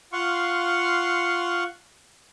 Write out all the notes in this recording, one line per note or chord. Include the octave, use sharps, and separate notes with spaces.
F4 F5 F#5 C6 C#6